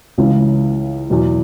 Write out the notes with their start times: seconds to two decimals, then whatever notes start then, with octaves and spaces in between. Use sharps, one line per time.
0.18 C#2 C#3 E3
1.10 E2 B2 F#3